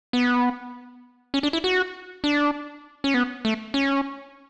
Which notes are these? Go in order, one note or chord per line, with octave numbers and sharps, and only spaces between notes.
B3
C#4
D4
E4
F#4
D4
C#4
B3
A3
C#4